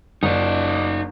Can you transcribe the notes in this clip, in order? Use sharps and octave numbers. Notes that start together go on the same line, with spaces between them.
F#1 D#4 D5